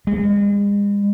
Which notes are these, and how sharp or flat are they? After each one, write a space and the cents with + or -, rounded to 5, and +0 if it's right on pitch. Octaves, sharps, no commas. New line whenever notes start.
G#3 -40